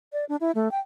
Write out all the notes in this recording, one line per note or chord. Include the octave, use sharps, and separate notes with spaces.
D5
D4
E4
A3
G5